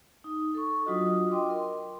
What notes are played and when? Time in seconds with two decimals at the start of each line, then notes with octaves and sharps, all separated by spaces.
0.24 D#4
0.54 A4 C#6
0.85 F#3 D4 F4 F#4 D#5 D#6
1.30 D#5 G5 C6 D6
1.50 A#4 C6